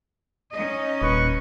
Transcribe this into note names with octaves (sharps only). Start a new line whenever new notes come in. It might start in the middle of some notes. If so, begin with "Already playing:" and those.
C#4 D#4 D#5
D#1 B4 C#6